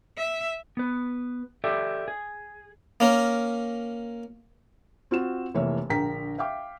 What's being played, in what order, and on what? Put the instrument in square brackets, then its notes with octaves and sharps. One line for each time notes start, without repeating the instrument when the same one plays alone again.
[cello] E5
[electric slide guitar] B3 B4
G4 A4 D5 E5
G#4
[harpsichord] A#3 C#4 A#4
[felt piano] C4 F4 F#4 E7
F1 E3 A#3 C#5 E5
A#1 D3 A#4 G5 A#5 B6
E5 F5 G5 D6